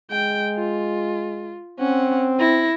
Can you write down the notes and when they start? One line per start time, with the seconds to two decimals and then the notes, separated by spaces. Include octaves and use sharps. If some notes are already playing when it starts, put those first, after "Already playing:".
0.11 G#3 G5
0.55 F4
1.79 C4 C#4 F#5
2.39 E4 A#6